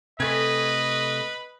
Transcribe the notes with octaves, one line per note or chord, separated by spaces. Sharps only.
C3 A3 B4 D#5 G#5